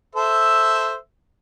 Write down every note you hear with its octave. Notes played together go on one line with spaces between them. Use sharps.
A4 C5 E5